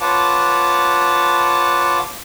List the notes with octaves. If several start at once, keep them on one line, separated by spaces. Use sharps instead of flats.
F4 B4 C#5 F#5 A5 D6